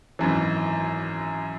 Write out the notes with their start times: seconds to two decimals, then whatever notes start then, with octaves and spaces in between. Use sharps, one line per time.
0.19 G#1 F#2 E3